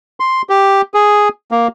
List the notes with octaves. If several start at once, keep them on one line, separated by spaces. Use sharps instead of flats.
C6
G4
G#4
A#3